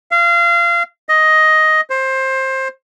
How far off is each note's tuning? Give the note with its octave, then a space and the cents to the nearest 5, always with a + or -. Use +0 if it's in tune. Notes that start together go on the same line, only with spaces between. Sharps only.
F5 -25
D#5 +10
C5 +20